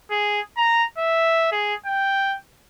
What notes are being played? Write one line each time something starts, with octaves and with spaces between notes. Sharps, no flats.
G#4
A#5
E5
G#4
G5